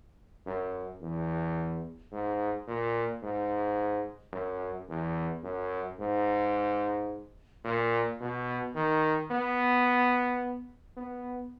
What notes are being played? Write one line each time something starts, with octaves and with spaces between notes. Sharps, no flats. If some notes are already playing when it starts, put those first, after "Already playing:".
F#2
E2
G#2
A#2
G#2
F#2
E2
F#2
G#2
A#2
B2
D#3
B3
B3